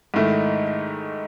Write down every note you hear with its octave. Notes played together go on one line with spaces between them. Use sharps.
G#2 D#3 A3 E4